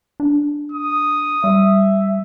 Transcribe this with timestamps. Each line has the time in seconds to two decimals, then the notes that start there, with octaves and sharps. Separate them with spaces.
0.20 D4
0.72 D#6
1.44 G3 E5